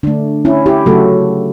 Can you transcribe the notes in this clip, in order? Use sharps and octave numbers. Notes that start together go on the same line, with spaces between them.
D3 A3 D4
C#4 E4
E4 G4
C#3 F#3 A3 F#4 A4